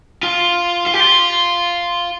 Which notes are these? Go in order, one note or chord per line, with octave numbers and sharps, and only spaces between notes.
F4
F4
G4
F4